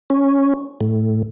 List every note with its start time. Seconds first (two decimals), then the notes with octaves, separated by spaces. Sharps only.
0.10 C#4
0.81 A2